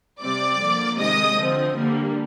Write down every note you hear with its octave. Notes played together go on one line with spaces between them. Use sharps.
C3 G3 C4 D5 D6
D3 F3 A#3
C3 D#3 G#3 D#5 D#6
D3 F3 C4
D3 G3 A#3